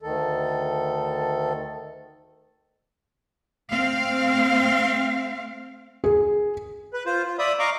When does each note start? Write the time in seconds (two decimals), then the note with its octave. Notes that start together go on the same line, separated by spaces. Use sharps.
0.02 D2 D#3 A4
3.69 A3 C4 F5
6.04 G#4
6.93 B4
7.06 F4 C5
7.26 F4
7.39 D5 E5 B5 D#6
7.59 D#5 F5 A#5 C#6 D6